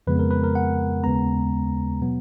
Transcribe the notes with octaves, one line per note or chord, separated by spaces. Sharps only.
F2 C#3 F3 G#3 B3 B4
A#4
B4
A#4
F#5
D#2 C#3 G#3 B3 A#5
B2 F#3 B3